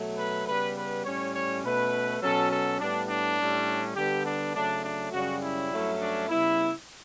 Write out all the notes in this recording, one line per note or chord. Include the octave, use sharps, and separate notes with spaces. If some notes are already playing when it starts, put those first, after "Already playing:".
Already playing: B2 F#3 A3
B4
C#3 G3 B3 B4
B4
A2 G3 C#4 C#5
C#5
B2 A3 C#4 B4
B2 F#3 C#4 A4
A4
A2 G3 B3 D4
D4
A2 G3 C#4
D3 G3 B3 G4
D4
C#3 F#3 A3 D4
D4
F#2 C#3 G3 C#4 F#4
E4
G2 F#3 A3 C#4
D4
C#3 G3 B3 E4